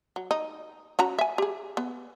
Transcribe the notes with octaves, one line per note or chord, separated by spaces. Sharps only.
F#3
D#4
C#4 F#4 A#5
E5 G#5
G4 G#4
B3